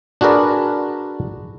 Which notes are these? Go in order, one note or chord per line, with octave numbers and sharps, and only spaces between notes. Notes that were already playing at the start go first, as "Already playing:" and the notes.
D4 F#4 G#4 A#4 B4 D5